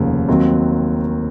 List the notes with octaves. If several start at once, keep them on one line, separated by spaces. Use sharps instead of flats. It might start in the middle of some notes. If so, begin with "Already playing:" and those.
Already playing: F1 D#2 C#3
D#2 D#3 F#3 C4